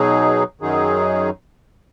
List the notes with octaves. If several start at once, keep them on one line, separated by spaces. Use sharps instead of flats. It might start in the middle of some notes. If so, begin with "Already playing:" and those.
Already playing: B2 F#3 D#4 G#4
F#2 D#3 F#3 D#4 G#4